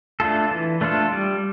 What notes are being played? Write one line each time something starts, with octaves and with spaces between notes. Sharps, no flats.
A3 D4 F4 A4
E3
A3 D4 F4 A4
G3